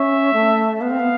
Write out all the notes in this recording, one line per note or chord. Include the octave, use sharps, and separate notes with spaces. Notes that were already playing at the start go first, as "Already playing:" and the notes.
Already playing: C#4 E5
A3
B3 F5
C4
B3